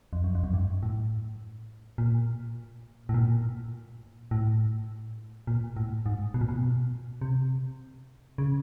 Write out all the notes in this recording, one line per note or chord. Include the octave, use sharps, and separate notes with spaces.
F2
F#2
F2
F#2
G2
A2
A#2
A2
A#2
A2
A#2
A2
G#2
B2
A#2
B2
C3
C#3